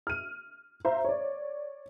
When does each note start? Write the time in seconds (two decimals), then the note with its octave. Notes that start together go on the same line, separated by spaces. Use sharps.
0.07 F6 D#7
0.85 C5 E5 F5 A#5
1.05 C#5 D5